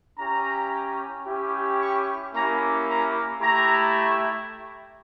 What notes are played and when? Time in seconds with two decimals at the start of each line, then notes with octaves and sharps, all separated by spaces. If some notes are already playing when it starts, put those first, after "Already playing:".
0.18 C#4 E4 G4 A#5
1.27 C#4 E4 G4
1.80 C#6
2.34 A#3 C#4 E4 G4 A#5
2.89 A#5
3.41 A3 E4 G4 A#5